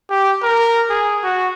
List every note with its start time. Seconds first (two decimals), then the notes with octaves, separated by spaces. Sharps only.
0.10 G4
0.43 A#4
0.89 G#4
1.24 F#4